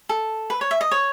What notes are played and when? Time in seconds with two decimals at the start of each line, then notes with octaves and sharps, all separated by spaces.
0.09 A4
0.50 B4
0.61 C#5
0.71 E5
0.81 D#5
0.91 C#5